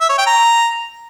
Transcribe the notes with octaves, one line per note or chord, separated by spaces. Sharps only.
E5
C#5
G5
A#5